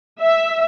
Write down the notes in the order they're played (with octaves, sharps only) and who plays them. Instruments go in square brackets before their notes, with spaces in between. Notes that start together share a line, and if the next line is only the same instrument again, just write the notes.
[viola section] E5